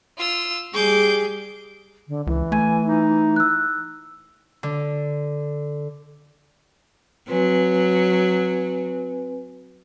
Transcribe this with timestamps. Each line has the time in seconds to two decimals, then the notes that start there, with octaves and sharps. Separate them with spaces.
0.18 F4 E6
0.74 G3 G#4 D6 G6
2.08 D3
2.27 C#2 E3
2.52 A3 G#5
2.83 D#4
3.36 E6 F#6
4.63 D3
7.28 F#3 C4 B4 G#5